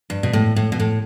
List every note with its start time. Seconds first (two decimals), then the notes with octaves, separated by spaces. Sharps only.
0.10 G2
0.23 B2
0.33 A2
0.56 A2
0.72 B2
0.79 A2